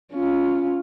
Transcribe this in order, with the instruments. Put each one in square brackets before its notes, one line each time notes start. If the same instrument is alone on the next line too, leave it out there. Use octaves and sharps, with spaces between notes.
[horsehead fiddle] C#4 F4